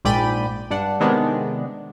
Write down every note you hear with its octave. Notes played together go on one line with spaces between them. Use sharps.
A#1 G#2 D5 G5 B5 D#7
G2 D4 F#5
C3 D#3 G#3 B3 D4